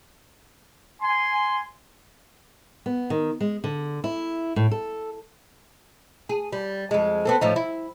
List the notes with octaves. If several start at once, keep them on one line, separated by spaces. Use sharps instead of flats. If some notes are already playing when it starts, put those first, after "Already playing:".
G#5 C6
B3
D#3
G#3
D3
E4
A2
A4
G#4
G3
F2 G#3
B3 C4 A4
A2 F3 D#4
E4